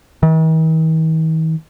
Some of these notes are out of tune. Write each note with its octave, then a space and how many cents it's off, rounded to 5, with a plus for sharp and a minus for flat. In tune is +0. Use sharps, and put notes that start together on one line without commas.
D#3 +45